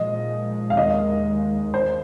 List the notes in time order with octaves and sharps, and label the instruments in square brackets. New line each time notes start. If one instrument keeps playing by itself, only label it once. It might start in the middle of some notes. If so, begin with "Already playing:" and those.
Already playing: [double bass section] A#2 F3 G#3 [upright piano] D#5
[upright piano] F5
[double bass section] D#2 D#3 G#3 [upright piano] D#5
[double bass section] D#2 [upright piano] C5